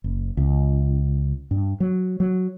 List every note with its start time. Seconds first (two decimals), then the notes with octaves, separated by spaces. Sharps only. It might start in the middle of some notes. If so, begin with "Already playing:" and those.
0.04 F#1
0.37 C#2
1.51 G2
1.80 F#3
2.20 F#3